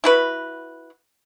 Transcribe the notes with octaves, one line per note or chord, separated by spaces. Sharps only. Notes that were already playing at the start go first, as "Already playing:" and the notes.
E4 F#4 B4